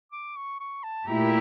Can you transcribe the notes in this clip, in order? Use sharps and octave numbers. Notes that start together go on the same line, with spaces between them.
D6
C#6
C#6
A5
A#2 A3 E4 G4 A#5